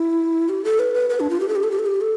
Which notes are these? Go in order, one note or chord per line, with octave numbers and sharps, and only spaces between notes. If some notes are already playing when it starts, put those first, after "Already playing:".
Already playing: E4
G4
A4
B4
B4
B4
D4
F4
G4
A4
G4
A4
G4
A4
G4
A4